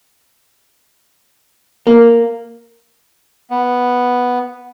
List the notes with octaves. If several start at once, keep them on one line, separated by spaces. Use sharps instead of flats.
A#3
B3